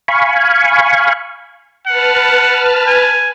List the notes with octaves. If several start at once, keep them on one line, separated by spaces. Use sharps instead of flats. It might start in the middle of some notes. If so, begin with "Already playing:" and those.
F5 G#5 B5 C#6
B4 F#5 A5 F6
G#5